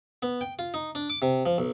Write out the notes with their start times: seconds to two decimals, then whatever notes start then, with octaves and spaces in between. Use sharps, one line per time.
0.22 B3
0.41 G5
0.59 F4
0.74 D#4
0.95 D4
1.10 D6
1.22 C3
1.46 F3
1.58 B1